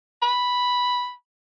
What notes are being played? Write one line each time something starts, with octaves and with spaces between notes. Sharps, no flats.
B5